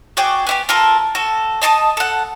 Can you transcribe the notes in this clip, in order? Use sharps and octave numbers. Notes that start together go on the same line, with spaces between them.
F#4 G#4 D5 G5
B3 E4 G4
F4 A4 A#4
F#4 A4
D#5 A5 C#6 D#6
A4 F#5